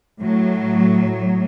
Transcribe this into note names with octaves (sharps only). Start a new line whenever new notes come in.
A2 F#3